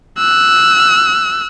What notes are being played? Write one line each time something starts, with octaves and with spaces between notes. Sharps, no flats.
E6 F#6